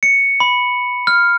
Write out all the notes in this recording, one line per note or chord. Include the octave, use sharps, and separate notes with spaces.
C#7
B5
F6